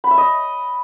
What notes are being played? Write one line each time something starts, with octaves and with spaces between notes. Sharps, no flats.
B5
E5
D#5